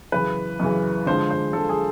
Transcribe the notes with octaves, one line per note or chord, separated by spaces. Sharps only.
F#2 C#3 E3 B4
F#2 C#3 E3
D3 F3 G#3 C5
C5
D3 F3 G#3 A4
G#4